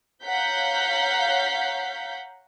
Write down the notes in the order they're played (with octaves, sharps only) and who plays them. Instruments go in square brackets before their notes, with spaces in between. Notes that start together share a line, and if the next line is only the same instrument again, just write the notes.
[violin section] C#5 F5 F#5 A#5 G6 B6